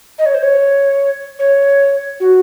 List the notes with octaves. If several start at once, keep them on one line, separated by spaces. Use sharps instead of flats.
D#5
C#5
C5
C#5
C#5
F#4